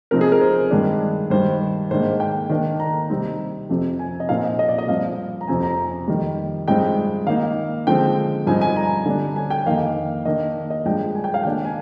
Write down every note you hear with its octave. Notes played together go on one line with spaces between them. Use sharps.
C3 F3 C4 D#4 A#4
G#4
A#4
C5
G2 D#3 G#3 D4
G2 D#3 G3 C5
G#2 D#3 A#3 D4 C5
G5
D#3 A#3 D4
A#5
C3 G3 C4 D#4
F2 C3 F3 C4
G#5
D#5
A#2 F3 C4 D#4 F5
D#5
D#5
D5
D#5
G2 F3 C4 F5
A#5
F2 C3 F3 C4 G#5
A#5
F2 D#3 G3
G2 F3 G#3 C4 D#4 G5
D#3 A#3 D#4 F5
D3 F3 G#3 C4 G5
G2 F3 C4 D#4 G#5
G#5
A#5
D3 G3 D4
G#5
G5
F2 D#3 A#3 D#4 F5
D#3 A#3 D4 D#5
D#5
G2 F3 G#3 D4 G5
G#5
G5
F5
D#3 A#3 D4 G5
G#5